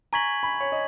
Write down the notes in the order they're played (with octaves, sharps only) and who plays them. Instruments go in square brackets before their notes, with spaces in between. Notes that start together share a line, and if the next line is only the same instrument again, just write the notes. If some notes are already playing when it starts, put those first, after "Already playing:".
[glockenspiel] G#5 C#6 G#6 B6 F#7 [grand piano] A#5
[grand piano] B5
C#5
D#5